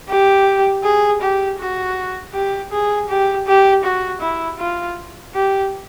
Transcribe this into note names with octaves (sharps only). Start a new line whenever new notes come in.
G4
G#4
G4
F#4
G4
G#4
G4
G4
F#4
E4
F4
G4